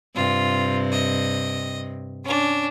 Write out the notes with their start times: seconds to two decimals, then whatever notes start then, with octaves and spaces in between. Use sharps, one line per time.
0.15 G2 C3 F4
0.92 D#5
2.25 C#4 D4